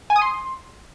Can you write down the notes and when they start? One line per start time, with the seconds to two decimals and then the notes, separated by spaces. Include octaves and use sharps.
0.10 G#5
0.16 D#6
0.22 C6